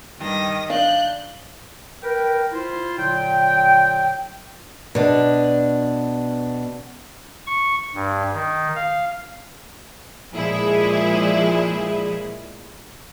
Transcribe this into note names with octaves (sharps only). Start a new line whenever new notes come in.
G2 D#3 D#6 A#6
D4 F5 F#6 G6
A#4 B4 G5
E4 F4 C5
A#2 D3 F#3 G5
B2 D4
C#6
G2
D#3
F5
A#2 F3 G#3 E4 G#4